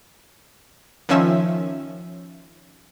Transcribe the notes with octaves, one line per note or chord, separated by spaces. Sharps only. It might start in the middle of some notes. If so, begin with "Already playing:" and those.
D#3 F3 C#4 E5